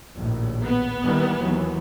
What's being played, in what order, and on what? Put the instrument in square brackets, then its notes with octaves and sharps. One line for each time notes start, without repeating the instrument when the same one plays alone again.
[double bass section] A#1 D#2 A2
[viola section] B3
[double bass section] D#3 E3 G3
D#2 E3 F#3